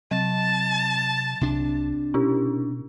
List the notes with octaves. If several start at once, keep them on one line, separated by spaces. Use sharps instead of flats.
C3 F#3 A5 A6
C2 C3 D4
B2 C#4 E4 G4